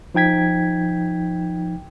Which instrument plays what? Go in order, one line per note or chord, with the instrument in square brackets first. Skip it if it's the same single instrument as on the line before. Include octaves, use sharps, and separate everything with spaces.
[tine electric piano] F3 D#4 G5 G#6 B6